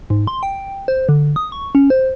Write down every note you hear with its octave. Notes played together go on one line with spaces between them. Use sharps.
G#2
C6
G5
C5
D3
D#6
C#6
C#4
C5